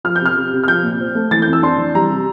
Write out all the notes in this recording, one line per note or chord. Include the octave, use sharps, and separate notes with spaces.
F3 F6
G6
C3 F6
C3
C3
F6
F3 G6
A#2
C4
A3
E3 A6
F2 G6
E6
D4 C6
E3
G3 A#5
C3